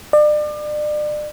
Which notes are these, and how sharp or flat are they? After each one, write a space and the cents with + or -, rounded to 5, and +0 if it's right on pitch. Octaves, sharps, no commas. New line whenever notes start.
D5 +35